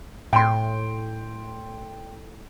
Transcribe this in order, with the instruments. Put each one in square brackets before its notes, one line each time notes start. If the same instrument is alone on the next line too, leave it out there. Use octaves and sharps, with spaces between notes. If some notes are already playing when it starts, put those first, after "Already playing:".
[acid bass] A2 [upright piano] G5 C6